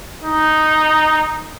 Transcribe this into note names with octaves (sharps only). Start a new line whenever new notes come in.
D#4